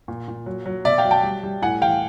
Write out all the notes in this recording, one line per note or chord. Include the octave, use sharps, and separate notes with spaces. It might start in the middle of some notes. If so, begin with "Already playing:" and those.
A#2
A#2
F#3
F#3
B2 D5 E5
F5 G5
F#3
G5 A5
G3
G3
A2 F#5 G#5
E3 F5 G5